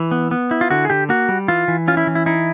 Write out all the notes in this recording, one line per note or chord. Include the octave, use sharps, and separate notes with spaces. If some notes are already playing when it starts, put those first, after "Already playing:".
Already playing: E3
B3
B3
E4
F4
D3 F#4
G#4
D3 G4
A#3 F#4
G3
E3 F4
E3
C#4 F4
E4
E3
E4
D#4 E4